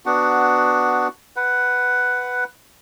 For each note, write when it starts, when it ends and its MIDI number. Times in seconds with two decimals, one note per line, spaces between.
0.06 1.08 59
0.06 1.08 62
0.06 1.08 66
0.06 1.08 78
1.36 2.44 71
1.36 2.44 78